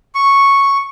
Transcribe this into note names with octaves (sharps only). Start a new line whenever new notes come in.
C#6